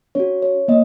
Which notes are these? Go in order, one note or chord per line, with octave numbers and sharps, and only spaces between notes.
C#4 F#4 C#5
C#5
A#3 D#5